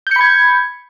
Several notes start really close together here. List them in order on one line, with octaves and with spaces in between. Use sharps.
G6 C#7 B5 G#6